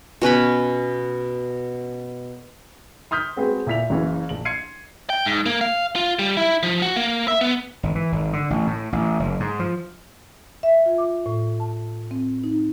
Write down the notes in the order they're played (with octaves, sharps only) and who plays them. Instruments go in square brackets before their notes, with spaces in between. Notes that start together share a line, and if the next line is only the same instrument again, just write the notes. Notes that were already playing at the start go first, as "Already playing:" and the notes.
[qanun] B2 C#4 B4 B5
[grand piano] C6 D#6 F6 G6 B6
G#3 C4 F#4 G#4 B4 C5
A#2 E4 B6 F7
F#1 C#3 E3
A#1 F#7
C6 G#6 C7 C#7 D#7
[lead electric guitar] G5
G#2
A#3
F5
F4
G3
E4
F3
F#4
A#3
E5
B3
[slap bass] G#1
E3
G#1
D3
A1
A2
A1
F#1
G#2
F3
[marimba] E5
F4
D6
A2
A5
C4
D#4